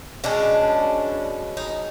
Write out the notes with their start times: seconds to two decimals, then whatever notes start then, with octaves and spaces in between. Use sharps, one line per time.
0.24 B2 G#3 C#4 D4
1.57 D#4